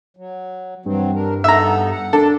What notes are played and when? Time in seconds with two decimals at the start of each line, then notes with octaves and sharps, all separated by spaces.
0.17 F#3
0.86 G2 E3 F#3 C4
1.15 D4 A#4
1.44 B3 D#4 A4 E5 A#5
1.92 F#5
2.13 D4 A4